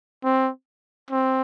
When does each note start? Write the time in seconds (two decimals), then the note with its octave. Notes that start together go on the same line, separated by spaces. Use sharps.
0.24 C4
1.11 C4